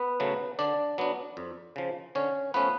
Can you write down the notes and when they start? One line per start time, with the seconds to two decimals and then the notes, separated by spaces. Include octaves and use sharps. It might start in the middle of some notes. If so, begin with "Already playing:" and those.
Already playing: B3 B4
0.20 C#3 F#3 A3
0.59 D3 D4 D5
0.98 F#3 B3 D4
1.37 F2
1.76 C#3 F3
2.15 D3 C#4 C#5
2.54 F3 A3 B3 C#4 B4